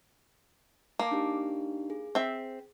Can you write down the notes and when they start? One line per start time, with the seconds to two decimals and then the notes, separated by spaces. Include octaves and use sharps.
0.99 A#3 A5 D6
1.11 D4 D#4 G4
1.90 G#4
2.15 C4 E5